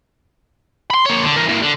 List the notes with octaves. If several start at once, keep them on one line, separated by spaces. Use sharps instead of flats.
B5 C6
A#3 C#5
D3
E3 A#4
E3 A#3
D3